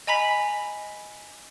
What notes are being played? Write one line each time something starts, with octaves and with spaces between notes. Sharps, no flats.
D#5 G#5 A#5 B5 B6